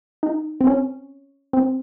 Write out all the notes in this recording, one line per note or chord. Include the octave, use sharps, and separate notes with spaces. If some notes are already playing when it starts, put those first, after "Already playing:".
D#4
C4
C#4
C4